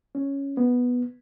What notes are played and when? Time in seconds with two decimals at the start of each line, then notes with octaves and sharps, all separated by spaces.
0.15 C#4
0.57 B3